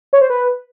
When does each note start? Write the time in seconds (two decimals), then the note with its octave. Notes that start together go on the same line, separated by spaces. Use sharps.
0.13 C#5
0.21 C5
0.30 B4